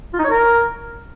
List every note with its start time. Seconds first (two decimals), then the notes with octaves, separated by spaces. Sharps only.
0.14 F4
0.19 D#4
0.24 C#5
0.30 A#4